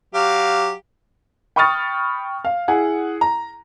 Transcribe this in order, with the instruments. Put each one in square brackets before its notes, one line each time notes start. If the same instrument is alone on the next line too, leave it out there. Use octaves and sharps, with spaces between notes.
[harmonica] F#3 G4 F5
[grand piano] G5 B5 C#6 D#6 F6 A6
F5
E4 G#4 F#5
A#5